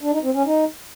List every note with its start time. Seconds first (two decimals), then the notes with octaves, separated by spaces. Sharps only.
0.01 D4
0.12 D#4
0.23 C4
0.35 C#4
0.46 D#4